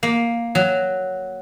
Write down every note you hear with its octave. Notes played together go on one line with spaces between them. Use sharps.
A#3
F#3